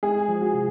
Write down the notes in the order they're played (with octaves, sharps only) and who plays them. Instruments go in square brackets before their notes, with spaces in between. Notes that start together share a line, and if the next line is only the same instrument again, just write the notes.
[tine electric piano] G#3 [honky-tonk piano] G#4
[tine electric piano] F3
[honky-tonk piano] F#4
[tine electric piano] C3